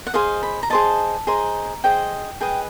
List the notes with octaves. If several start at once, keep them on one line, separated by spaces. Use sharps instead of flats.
F#5
G#4 C5 D#5 F5
B5
A#5
G#4 C5 D#5 A5
G#4 C5 D#5 A#5
G#4 C5 D#5 G5
G#4 B4 D#5 G5